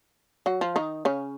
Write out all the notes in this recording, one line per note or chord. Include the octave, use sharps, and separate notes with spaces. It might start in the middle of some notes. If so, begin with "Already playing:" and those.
F#3 F#4
F3 F4
D#3 D#4
C#3 C#4